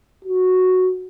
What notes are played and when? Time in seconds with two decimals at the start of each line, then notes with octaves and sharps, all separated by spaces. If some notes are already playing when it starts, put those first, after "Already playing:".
0.25 F#4